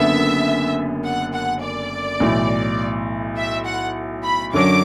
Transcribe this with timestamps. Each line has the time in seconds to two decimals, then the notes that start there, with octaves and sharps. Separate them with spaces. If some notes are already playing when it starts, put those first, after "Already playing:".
Already playing: F#1 F#2 D3 B3 E5
1.04 F#5
1.33 F#5
1.63 D5
2.20 B1 A2 E3
3.37 E5
3.66 F#5
4.24 B5
4.53 F#2 D3 F#3 D4 D6